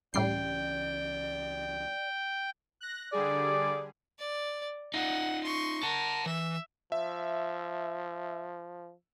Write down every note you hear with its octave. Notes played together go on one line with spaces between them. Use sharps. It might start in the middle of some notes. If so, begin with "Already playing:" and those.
C#2 A2 E3 G3 C#4 D5 G5 C7
F#6 A#6
D3 G3 G#4 D5
D5
D#4 F4 F#5
C6 C#6
A#4 F#5 A5
E3 E5
F3 E5